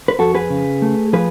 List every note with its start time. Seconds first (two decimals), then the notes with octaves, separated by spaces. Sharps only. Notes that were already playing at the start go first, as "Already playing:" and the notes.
0.08 B4
0.19 F2 F#4 A4
0.35 G#4 B4
0.50 C#3
0.82 A3
1.13 F3 G#4 B4